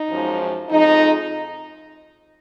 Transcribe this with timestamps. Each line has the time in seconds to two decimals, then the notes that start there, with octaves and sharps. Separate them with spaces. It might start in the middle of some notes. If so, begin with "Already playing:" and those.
Already playing: D#4
0.10 F#2 F3 G#3
0.70 F2 F3 G#3 D#4